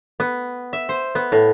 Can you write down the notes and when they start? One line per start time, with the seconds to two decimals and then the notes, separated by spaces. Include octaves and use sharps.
0.20 B3
0.73 E5
0.89 C5
1.15 B3
1.32 A2